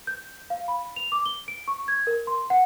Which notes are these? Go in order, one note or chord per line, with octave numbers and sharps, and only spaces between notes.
G6
F5
B5
F7
D6
G7
D7
C#6
G#6
A#4
C6
F#5